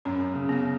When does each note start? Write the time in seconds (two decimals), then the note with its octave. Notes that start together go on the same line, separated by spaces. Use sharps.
0.05 F#2 C#4
0.34 C#3
0.49 B3